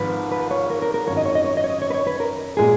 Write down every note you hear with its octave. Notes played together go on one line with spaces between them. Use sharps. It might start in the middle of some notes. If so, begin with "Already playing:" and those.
Already playing: G#1 G#2 F3 B4
B4
C#5
A#4
A#4
A#4
G#1 F#2 D#3 C#5
D#5
C#5
D#5
C#5
D#5
C#5
D#5
C#5
B4
C#5
B4
A#4
A#2 G#3 G#4